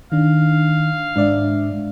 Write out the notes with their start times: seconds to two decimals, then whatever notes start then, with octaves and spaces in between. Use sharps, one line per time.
0.12 D#3 D4 F5
1.16 G#2 D4 D5 E5